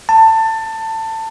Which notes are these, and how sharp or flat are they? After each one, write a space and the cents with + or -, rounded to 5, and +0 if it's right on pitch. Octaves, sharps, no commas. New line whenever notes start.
A5 +20